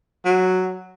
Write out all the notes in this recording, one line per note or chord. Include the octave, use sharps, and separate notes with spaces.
F#3